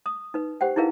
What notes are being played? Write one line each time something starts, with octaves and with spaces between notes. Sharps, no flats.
D#6
D#4 B4
G4 C5 F#5 G5
D#4 E4 G#4 A#4 B4 F5